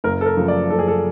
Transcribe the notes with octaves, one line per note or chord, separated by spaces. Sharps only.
F#1 A#4
A4
A#4
F#2 C#3 F3 A3
D5
F#1 A4
G#4
A4